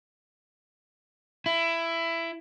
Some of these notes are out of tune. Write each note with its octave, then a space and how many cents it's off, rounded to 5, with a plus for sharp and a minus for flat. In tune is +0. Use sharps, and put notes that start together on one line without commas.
E4 +15